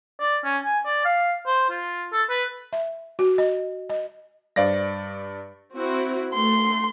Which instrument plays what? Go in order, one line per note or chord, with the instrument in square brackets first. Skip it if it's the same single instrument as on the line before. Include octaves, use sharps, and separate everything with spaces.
[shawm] D5
C#4
G#5
D5
F5
C5
F4
A4
B4
[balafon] E5
F#4
D#5
D#5
[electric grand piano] G2 D5 A#6 [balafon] G3 C5 F5
[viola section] C4 E4 F#4
[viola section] A3 [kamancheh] C6